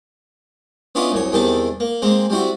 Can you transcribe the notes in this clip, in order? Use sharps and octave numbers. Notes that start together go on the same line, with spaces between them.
B3 C#4 D4 E4 F4 D#5
C2 F#2 C#5
E2 C3 D#3 G3 A4 A5
A#3
G#3 A#3 C4
G3 C4 E4 F#4